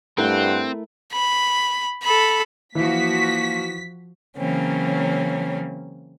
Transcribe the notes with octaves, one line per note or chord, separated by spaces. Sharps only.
G2 A3 C4 E4 A#4 F#5
B5
A4 B5
E3 F3 A#3 F#4 B6
C#3 E3 F#3 A#3 C4 C#4